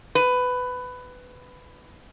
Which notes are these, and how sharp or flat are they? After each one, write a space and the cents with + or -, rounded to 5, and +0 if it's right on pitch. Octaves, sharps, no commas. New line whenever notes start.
B4 +15